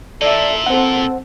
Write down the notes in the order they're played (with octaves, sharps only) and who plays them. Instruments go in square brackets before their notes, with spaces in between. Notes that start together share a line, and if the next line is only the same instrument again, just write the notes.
[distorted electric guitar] A#2 [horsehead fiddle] A4 E5 [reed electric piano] D5
[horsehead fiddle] C4 A4 [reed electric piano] C5 F#5